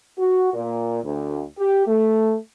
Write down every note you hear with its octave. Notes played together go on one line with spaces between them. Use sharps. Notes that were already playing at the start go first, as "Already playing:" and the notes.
F#4
A#2
D2
G4
A3